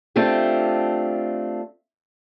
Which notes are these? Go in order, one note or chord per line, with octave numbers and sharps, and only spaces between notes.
A3 C4 D4 F4 G4